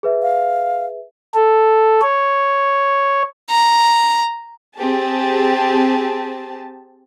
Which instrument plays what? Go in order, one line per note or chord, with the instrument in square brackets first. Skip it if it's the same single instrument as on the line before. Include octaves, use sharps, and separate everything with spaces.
[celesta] G#4 B4 E5
[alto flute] F5
[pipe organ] A4
C#5
[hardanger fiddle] A#5
[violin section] C4 G4 G#4 A5